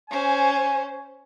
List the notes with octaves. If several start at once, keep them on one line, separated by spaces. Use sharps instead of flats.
C#4 C5 G#5